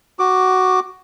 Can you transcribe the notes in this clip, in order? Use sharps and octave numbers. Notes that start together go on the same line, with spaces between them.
F#4 D6